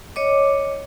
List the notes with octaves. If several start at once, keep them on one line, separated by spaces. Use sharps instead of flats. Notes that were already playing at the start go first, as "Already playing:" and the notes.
C#5 D#5 D6